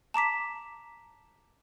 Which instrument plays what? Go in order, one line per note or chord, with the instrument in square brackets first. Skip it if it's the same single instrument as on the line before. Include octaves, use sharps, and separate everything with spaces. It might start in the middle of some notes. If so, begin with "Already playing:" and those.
[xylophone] A5 A#5 D6 B6